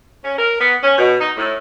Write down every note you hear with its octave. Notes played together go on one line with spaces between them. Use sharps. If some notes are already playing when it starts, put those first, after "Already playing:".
C#4
A#4
B3
C#4
B2
D#4
A2